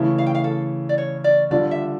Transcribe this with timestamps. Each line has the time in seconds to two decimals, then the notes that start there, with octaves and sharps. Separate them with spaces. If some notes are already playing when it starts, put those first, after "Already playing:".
Already playing: C#3 E3 A3 E4
0.18 F5
0.27 G5
0.35 F5
0.44 A4
0.89 D5
0.98 C#5
1.24 D5
1.51 D3 G3 D4 F4 D5
1.71 E5